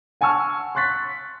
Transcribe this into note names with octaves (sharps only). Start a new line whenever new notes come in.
F#5 G#5 A5 C#6 E6 F6
C6 C#6 F#6 A6 B6